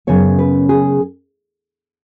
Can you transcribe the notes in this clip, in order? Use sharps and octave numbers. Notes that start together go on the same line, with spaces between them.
F#2 C#3 B3 C#5
B4
G#4